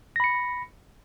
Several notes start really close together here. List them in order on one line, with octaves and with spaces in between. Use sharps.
A#6 B5 C#7